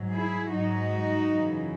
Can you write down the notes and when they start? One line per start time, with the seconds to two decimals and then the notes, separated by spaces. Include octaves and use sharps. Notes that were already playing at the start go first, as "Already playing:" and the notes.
Already playing: G#2 F#3
0.11 E4 G#4
0.51 G#2 F#3 D#4 F#4
1.29 F#2 C#3 E3